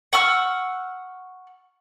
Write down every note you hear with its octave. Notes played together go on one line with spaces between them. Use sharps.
F#5 C#6 E6 F6